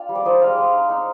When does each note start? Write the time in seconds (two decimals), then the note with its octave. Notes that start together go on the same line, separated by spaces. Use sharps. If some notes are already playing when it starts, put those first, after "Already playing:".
Already playing: D4 F4 F5 G5
0.09 G3
0.15 D5
0.25 D#4 C5 D#5
0.41 G#3 D5 F5
0.58 G#3
0.73 D#4
0.90 D#4